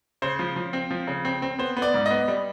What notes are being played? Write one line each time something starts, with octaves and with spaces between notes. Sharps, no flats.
C#3 C5
F3
F3
C4
F3
C#3
C4
C4
B3 C5
B3
D5
G#2
B3 D#5
G3